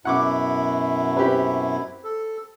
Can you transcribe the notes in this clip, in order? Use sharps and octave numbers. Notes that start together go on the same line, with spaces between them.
F#2 B2 E4 F#5 C#6 D6
C4 G4 B4
A4